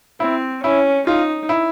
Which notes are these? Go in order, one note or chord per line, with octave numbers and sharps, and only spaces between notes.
C4 E4
C#4 E4
D#4 F4
E4